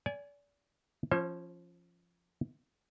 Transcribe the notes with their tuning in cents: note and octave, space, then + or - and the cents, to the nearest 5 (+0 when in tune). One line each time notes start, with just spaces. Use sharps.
D5 -35 G#5 +0
F3 -15 C#4 -20 C5 +30